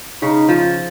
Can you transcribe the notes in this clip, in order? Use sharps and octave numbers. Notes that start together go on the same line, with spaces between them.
C#3 D#4
F3